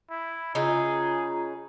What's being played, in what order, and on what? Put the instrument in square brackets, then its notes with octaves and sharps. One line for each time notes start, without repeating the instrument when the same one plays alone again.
[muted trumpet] E4
[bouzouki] C#3 D#4 [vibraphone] F4 A#5 [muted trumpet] G#4